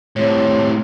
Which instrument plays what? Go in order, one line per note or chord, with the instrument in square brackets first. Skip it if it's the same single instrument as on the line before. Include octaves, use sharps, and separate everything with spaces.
[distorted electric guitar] A2 C3 [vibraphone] C#5